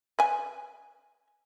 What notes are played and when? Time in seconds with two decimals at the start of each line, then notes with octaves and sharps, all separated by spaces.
0.19 B4 G#5